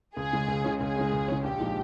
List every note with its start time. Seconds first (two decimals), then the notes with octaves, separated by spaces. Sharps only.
0.16 C#2 G#4
0.33 C#3 G#3 C#4
0.48 C#2
0.64 C#3 G#3 C#4
0.80 C#2 G#4
0.96 C#3 G#3 C#4
1.12 C#2
1.28 C#3 G#3 C#4
1.44 A#1 G4
1.59 A#2 F3 G#3 D#4